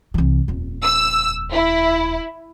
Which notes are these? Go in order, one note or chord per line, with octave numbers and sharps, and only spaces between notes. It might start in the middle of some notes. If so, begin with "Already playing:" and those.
C2 E3
D#1 F2
E6
E4